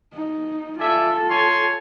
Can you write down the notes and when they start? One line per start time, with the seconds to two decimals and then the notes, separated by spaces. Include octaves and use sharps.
0.14 D#4
0.79 F4 A4 D5 E5 G#5
1.30 C#5 G#5 C6